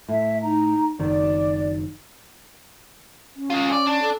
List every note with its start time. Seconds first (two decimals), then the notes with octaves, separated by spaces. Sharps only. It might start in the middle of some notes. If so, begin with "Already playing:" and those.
0.09 A2 E5
0.42 D#4 A#5
0.99 F#1 D#3 D5
3.36 C#4
3.50 G#3 F4
3.72 D5
3.87 D4
4.02 A4